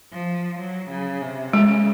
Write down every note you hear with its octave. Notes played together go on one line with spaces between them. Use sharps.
F3
F#3
C#3
C3
C#3 G#3